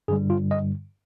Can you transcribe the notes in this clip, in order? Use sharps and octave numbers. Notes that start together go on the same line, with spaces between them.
G2 D3 G3 G#4
F4
D#5